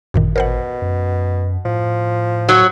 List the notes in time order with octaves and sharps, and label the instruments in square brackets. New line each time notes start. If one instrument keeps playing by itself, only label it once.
[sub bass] G#1 [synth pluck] F#2 A#2 D#3
[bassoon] B2 [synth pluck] A#4 C5 F#5
[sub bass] F#2
[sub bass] A2 [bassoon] F3
[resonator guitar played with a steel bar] F#3 C#5